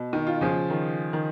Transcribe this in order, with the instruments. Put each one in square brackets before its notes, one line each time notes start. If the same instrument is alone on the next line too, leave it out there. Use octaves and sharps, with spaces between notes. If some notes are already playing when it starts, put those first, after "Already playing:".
Already playing: [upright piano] B2
[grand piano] D#3
[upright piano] F4
[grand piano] C#3 F3
[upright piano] D#3
D#3